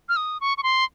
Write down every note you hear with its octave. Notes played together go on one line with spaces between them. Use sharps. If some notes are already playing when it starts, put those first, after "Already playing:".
F6
D#6
C#6
C#6
C6